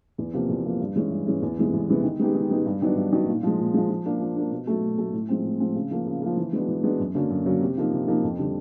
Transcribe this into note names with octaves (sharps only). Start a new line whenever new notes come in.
E2
C3 F3 A#3
E2
C3 F3 A#3
G2
E3 G#3 C#4
G2
E3 G#3 C#4
E2
C3 E3 G#3 B3
E2
C3 E3 G#3 B3
D#3
G#3 B3 D#4 G4
D#3
G#3 B3 D#4 G4
G2
D#3 F#3 B3 D4
G2
D#3 F#3 B3 D4
A#2
F3 G#3
A#2
F3 G#3
F3
A#3 D4
F3
A#3 D4
B2
F#3 A3
B2
F#3 A3
A2
F3 G#3 C4
A2
F3 G#3 C4
C#3
F3 A#3
C#3
F3 A#3
E3
G#3 B3 D4 F#4
E3
G#3 B3 D4 F#4
F#2
D3 F#3 A#3 C#4
F#2
D3 F#3 A#3 C#4
C3
F3 A#3 D#4
C3
F3 A#3 D#4
F2
D3 G3